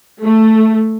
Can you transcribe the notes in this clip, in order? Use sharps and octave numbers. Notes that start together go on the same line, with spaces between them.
A3